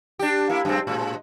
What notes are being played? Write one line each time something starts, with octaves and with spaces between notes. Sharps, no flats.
D4 G4
A#3 E4
F#2 G#3 C4
A2 G#3